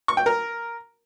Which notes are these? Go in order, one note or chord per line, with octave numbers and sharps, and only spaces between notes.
C#6
G5
A#4